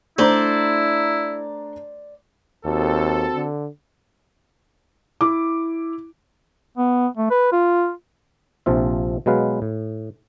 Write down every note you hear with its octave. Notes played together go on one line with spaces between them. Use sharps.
A3 D4 E4 C5 D5 A#5
D#2 C4 F#4 A4
D3
E4 D6
B3
A3
B4
F4
A#1 C3 F3 F4 E5
B2 F#3 G#3 B4 F5
A2